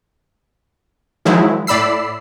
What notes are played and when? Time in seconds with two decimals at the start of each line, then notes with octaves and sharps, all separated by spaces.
1.25 D#3 F3 F#3 G#3 E4
1.67 A2 D5 B5 E6 C7